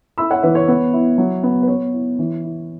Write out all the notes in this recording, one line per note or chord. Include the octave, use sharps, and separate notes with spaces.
E4 B5 E6
C#5 F#5
E3 B4 E5
C#5
B3
E4
F#3
B3
B4
B3 C#5
E4
E3
E4